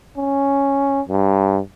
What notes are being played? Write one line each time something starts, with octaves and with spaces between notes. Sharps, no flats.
C#4
G2